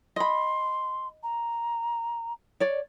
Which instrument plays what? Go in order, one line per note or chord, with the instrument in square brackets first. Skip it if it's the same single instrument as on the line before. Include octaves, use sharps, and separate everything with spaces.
[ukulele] D#5 B5 [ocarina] C6
[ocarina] A#5
[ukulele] C#5 D5